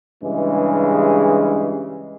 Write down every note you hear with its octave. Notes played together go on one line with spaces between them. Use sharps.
G2 C#3 E3 G#3